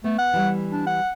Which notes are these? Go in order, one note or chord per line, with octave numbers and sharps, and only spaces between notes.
A3 B3
F#5
E3 G3
D4
F#5